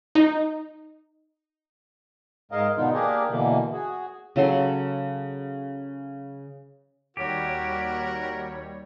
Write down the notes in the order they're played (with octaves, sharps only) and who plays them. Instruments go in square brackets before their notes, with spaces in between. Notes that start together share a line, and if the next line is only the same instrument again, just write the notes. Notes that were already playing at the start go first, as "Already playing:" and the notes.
[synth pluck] D#4
[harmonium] G#2 G#3 A#4 D#5 F5
B2 D3 D#3 B3 D#4 F4
A#3 D4 G4 G#4 A#4
B2 D3 E3 A#3
F#4 G#4
[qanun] C#3 F#3 A4 C6
[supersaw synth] D#2 G3 C#5 [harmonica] F#4 A#4 [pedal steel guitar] G4